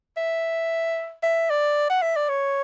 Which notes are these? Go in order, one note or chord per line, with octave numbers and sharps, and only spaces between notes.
E5
E5
D5
F#5
E5
D5
C#5